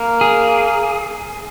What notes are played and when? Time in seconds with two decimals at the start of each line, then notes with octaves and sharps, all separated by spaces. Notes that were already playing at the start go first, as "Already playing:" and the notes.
Already playing: A#3
0.21 G#4